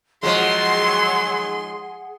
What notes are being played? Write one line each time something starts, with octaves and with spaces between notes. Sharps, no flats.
D#3 F3 F#3 G#3 G#4 F#5 C6